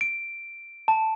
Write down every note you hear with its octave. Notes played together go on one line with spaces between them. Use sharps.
D7
A5